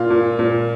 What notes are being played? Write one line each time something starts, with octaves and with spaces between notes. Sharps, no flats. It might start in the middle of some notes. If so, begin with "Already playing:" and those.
Already playing: A#2 F4
A#2
A#2